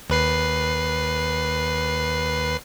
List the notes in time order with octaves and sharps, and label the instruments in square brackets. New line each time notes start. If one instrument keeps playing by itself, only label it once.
[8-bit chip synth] D#2 B4 C7